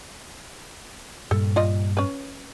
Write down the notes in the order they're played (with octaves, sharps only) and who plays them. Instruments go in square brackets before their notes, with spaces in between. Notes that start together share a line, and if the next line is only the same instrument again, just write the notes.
[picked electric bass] G2 A#2 G3 [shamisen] A4
[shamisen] F4 D5 D#5
C#4 B4